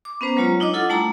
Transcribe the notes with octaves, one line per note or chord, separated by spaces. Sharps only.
D6
B3 C#4 B4 C5 A#5
F#3 G#3 F4 C#5 A#5
D4 D#4 D#5 D6
E4 F4 A4 F#5
G3 A3 D4 A5 A#5 D6